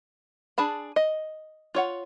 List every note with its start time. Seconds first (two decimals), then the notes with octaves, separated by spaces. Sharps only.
0.58 D4 G#4 A5 B5
0.96 D#5
1.75 F4 C#5 F#5